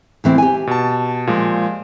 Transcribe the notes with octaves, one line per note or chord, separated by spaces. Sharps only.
D2 E3 C4
G4 G#5
B2 A5
A#2 F3 G#3